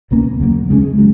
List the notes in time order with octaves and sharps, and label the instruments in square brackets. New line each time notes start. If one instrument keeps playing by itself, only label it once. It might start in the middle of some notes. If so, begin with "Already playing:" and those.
[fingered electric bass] C#2 B2 A#3 C#4
E2 C#3 F#3 A#3
[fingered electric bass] C#2 C#3 F#3 C#4 [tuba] G#3
[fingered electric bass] F#3